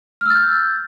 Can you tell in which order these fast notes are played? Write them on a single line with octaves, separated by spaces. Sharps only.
F6 E6 A6 G6